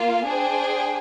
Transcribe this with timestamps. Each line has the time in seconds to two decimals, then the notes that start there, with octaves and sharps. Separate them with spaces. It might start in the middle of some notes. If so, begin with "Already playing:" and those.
Already playing: A#3 F4 F5
0.26 D4 G#4 C5 G5